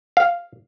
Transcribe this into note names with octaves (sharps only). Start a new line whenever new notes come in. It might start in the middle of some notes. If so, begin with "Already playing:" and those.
F5